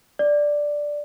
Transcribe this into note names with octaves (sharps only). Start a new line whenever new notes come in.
D5